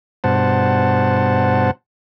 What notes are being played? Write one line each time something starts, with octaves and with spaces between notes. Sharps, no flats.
G2 B2 C5 F#5 A5